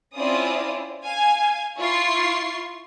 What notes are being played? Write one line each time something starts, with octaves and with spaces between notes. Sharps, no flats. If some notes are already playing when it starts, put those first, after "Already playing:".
C4 C#4 E4 F4 D5 D#6
F5 G#5 G#6
E4 F4 C6 C#6 C7